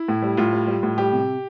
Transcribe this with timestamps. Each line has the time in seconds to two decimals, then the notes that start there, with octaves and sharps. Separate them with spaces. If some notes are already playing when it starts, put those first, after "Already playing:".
Already playing: E4
0.08 A2
0.22 G3
0.37 A2 F4
0.53 G3
0.67 G3
0.83 A2
0.98 G3 G4
1.13 C3